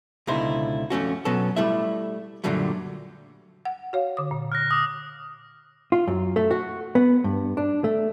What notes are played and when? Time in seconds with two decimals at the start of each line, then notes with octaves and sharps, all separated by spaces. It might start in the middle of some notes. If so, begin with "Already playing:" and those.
0.27 C#2 B2 D3 D#4 E4 C5
0.90 F2 A3 C#4 F#4
1.25 B2 F#3 B3 C#4 A4
1.56 G3 A3 E4 E5
2.44 F#2 A#2 D3 F#3 G3 A3
3.65 F#5
3.93 F#4 C#5 F5
4.17 D3 D#6
4.31 A#2
4.52 F6 F#6 A#6
4.71 D6 D#6
5.92 F4
6.07 F#2
6.36 A3
6.51 F#4
6.95 B3
7.24 G2
7.57 D4
7.84 A3